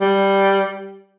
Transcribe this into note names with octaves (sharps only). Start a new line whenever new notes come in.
G3